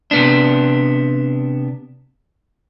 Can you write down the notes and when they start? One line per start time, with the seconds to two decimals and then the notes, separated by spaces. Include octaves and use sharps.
0.11 C3 B3 D4